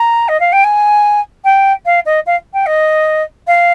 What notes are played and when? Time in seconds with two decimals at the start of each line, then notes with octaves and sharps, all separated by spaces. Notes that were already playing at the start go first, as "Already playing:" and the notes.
Already playing: A#5
0.29 D#5
0.40 F5
0.53 G5
0.64 G#5
1.44 G5
1.86 F5
2.06 D#5
2.26 F5
2.54 G5
2.66 D#5
3.47 F5